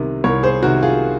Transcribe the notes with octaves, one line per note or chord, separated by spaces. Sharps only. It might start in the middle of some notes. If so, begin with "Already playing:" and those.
Already playing: C2 C3 D#3
C2 A#4 C#5
G#4 C5
C3 D#3 F#4 A#4
F4 G#4